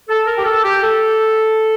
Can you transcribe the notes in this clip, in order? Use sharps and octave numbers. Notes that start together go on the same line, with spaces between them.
A4
A#4
G4
A4
G4
A4